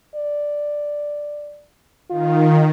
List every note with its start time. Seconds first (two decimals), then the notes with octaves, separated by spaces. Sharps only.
0.15 D5
2.10 D#3 F4